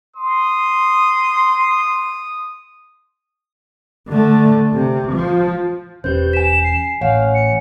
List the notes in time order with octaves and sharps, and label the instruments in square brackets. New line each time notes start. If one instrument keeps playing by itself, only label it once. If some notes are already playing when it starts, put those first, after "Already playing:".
[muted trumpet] C6 [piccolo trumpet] D#6
[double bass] D3 A3
C3
F3
[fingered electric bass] E1 C#4 [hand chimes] G4 B4 C5 [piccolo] G6
[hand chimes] G#5 B6 [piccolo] E7
[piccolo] C7
[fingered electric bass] A1 [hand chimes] C#5 F#5 G#5 [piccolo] F5
[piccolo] C#7